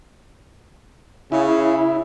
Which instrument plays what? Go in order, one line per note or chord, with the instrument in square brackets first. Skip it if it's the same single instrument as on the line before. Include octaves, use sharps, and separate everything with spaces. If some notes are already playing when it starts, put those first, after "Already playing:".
[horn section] C#3 [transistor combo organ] E4